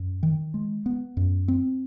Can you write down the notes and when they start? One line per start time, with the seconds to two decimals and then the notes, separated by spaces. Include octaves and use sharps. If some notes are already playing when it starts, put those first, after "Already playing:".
Already playing: F#2
0.23 D#3
0.54 G#3
0.86 B3
1.17 F#2
1.48 C4